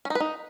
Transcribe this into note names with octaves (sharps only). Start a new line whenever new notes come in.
C#4
D#4
B4
D#4